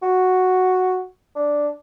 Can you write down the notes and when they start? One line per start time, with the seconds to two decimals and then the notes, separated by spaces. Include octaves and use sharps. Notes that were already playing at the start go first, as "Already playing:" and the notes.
0.02 F#4
1.35 D4